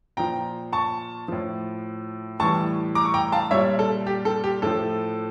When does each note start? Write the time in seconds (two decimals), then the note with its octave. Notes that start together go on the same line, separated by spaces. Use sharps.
0.17 A#2 F3 G5 A#5
0.73 A5 C#6
1.28 A2 F3
2.40 A2 E3 G3 A5 C#6
2.95 A#5 D6
3.05 C#6
3.14 G5 A#5
3.32 F5 A5
3.51 A#2 G3 C#5 E5
3.79 A4
4.07 G4
4.25 A4
4.44 G4
4.62 A2 F3 A4